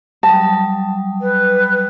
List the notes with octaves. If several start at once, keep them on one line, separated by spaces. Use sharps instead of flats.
F#3 G3 A5 D#6
B4